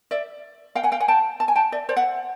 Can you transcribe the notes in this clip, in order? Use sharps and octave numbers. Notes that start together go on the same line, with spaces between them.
D5 E5
F5 G5
F#5 G#5
F5 G5
F#5 G#5
G5 A5
A5
G#5
G5 A5
D5 E5
C5 D5
E5 F#5